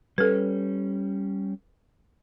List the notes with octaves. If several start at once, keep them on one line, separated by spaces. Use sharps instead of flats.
G3 C#4 A4 B4